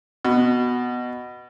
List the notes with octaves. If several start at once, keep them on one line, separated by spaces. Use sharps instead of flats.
B2